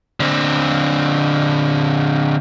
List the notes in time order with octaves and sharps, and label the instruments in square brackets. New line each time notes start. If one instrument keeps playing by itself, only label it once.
[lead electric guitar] D3 C4